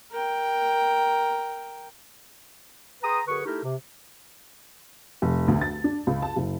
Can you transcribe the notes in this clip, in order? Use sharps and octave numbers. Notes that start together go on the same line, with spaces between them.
A#4 G5
G#4 B4 G5 A#5 C6 D#6
F#2 D3 G#4 B4 C#6
A3 D#4 E4 G4 A#4
C3
F1
D2
A6
D4
C#2
A5
F#1